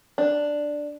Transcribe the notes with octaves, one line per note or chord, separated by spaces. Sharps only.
D4